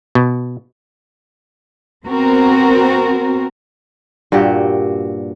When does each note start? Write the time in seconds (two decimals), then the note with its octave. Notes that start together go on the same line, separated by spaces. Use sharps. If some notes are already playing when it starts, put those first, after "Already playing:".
0.15 B2
2.06 B3 C4 F#4 A#4
4.32 G2 A#2 F#4 G4